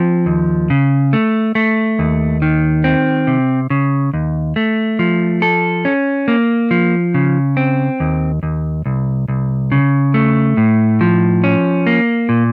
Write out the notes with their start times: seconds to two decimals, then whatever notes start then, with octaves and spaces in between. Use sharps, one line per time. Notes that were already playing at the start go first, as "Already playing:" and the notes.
Already playing: F3 C4
0.26 D#2
0.70 C#3
1.13 A3
1.55 A3
1.99 D#2
2.42 D#3
2.84 C4
3.27 C3
3.70 C#3
4.14 D#2
4.56 A3
4.99 F3
5.42 A4
5.85 C#4
6.28 A#3
6.71 F3
7.14 C#3
7.57 C4
8.00 D#2
8.43 D#2
8.86 C2
9.28 C2
9.72 C#3
10.14 A3
10.57 A2
11.01 F3
11.44 C#4
11.87 A#3
12.29 A#2